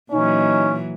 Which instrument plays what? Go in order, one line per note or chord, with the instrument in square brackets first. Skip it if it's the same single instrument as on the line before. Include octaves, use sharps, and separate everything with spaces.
[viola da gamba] A#2 E3 F#3 [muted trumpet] C#4 [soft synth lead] D#4